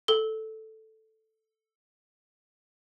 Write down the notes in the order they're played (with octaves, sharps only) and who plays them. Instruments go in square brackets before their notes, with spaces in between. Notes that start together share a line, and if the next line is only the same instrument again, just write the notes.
[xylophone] A4 G7